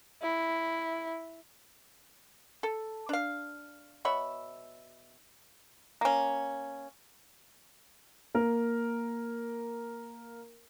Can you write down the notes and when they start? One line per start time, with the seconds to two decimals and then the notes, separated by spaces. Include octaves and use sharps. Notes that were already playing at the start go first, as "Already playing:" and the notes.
0.23 E4
2.63 A4
3.09 D4 F5
4.05 B2 C#5 E5 B5
6.01 A#3 C#4
8.35 A#3 A#4